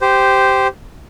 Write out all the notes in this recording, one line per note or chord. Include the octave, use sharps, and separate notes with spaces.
G4 C5